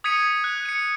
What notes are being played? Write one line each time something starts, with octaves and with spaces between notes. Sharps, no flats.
D#6 G#6 B6 C#7 D#7
F#6
C#7 D#7